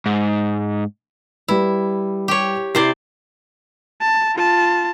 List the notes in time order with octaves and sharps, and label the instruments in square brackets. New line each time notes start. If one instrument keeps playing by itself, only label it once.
[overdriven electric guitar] G#2
[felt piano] G3 B4 [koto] E4
[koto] G4 C#5
[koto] C3 C5 D5 [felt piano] E4 C7
[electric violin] A5
F4 A5